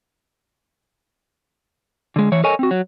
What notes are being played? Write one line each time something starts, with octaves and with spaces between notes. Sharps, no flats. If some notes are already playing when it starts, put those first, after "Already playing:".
D3 G#3
E3 C#5
A4 A#4 C#5 D#5 G#5
C4 F#4
F#3